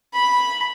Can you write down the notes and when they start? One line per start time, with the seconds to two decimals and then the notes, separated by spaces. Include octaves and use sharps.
0.13 B5